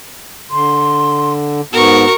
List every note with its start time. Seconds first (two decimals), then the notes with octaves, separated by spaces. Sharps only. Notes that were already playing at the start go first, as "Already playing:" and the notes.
0.51 D3 C6
1.73 G#2 B3 F#4 A#4 C#6